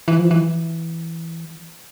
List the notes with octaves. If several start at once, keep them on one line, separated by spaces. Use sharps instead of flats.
E3
F3
E3